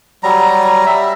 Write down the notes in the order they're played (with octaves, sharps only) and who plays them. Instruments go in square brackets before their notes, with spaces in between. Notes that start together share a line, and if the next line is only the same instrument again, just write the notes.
[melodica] F#3 G3 A#5
G3 E5